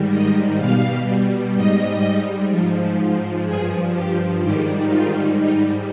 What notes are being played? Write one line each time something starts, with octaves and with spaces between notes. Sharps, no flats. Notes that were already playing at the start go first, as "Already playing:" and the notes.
Already playing: G#2 D#3 G3
D#5
B2 G3 F5
G#2 G3 D#5
G#2 F3
G2 F3 G#4
G4
G#2 D#3 G3 G4
F4
G#2 G3 D#4